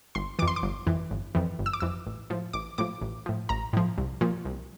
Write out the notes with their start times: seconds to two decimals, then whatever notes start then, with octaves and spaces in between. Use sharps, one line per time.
0.15 G1 C6
0.39 F2 E3 D6
0.48 C6
0.56 D6
0.63 G1
0.87 F2 E3
1.11 G1
1.35 F2 E3
1.59 G1
1.66 E6
1.73 D6
1.80 F2 E3 E6
2.06 A1
2.30 A2 F3
2.53 A1 D6
2.78 A2 F3 D6
3.01 A1
3.26 A2 F3
3.49 A1 A#5
3.73 A2 F3
3.98 C2
4.21 A#2 F3
4.45 C2